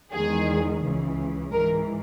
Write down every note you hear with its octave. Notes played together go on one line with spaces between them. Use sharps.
E2 D#3 G#3 G#4
C#2 C#3 E3
G#2 E3 G#3 A#4